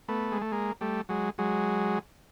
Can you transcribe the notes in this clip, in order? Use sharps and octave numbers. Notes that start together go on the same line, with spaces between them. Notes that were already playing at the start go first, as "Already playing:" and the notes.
A3 B3
G#3
A3
G#3 A#3
G3 A3
F#3 G#3
F#3 G#3